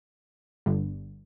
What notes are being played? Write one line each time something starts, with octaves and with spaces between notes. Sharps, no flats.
G1 G2 D3